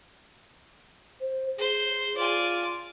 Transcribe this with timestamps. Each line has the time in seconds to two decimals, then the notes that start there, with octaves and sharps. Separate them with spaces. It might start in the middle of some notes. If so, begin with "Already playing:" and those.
1.21 C5
1.58 G#4 C5
2.17 F4 D5 G#5